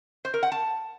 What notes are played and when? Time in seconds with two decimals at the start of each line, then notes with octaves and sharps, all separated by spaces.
0.25 C5
0.34 A#4
0.43 F#5
0.52 A5